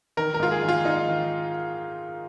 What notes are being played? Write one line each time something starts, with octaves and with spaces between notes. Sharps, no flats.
D#3 A#4
A#4
G#2 F4
G#4
D#3
F4
G#2 D#4
D#3